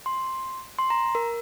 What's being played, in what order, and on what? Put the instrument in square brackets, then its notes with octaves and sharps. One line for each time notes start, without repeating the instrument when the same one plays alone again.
[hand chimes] C6
C6
A#5
A#4